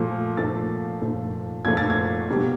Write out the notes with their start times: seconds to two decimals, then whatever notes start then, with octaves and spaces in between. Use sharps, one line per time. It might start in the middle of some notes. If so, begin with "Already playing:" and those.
Already playing: A#2 F3 A3
0.37 A#2 F3 A3 A6
1.02 A#2 F3 A3
1.65 A#2 F3 A3 G#6
1.77 A6
1.90 G#6
2.28 B2 G3 A#3